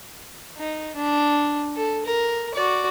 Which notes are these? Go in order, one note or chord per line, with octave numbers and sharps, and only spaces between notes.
D#4
D4
A4
A#4
F#4 D5